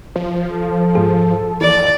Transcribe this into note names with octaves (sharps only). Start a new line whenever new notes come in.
F3
A4
G#2 G#4
D#2 E3 D5